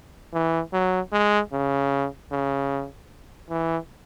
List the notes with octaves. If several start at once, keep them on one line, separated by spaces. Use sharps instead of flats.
E3
F#3
G#3
C#3
C#3
E3